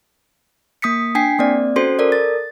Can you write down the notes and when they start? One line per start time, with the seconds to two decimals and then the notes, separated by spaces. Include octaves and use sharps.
0.82 A#3 D#6 B6 C#7
1.15 D4 G5 G#5 B6 C7
1.39 A#3 C4 D5
1.76 C#4 F#4 A4 C5 C6
1.99 A4 A#4 D5
2.12 A6